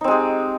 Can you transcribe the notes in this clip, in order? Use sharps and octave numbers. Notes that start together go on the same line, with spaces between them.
G#3 C4 D#4 G4